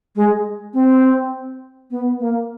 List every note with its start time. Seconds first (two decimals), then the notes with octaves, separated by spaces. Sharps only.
0.16 G#3
0.74 C4
1.91 B3
2.19 A#3